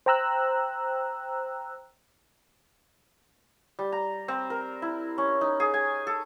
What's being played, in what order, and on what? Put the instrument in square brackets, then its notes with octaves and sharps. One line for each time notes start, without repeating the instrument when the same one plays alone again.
[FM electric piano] C5 G5 A#5 E6 F#6
[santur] G3
A#5
C4
A#4
E4
C#4
D#4
G#4
G#5
A4